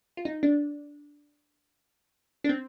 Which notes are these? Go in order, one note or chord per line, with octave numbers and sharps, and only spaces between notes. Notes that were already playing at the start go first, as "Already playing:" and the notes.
F4
D#4
D4
D4
C4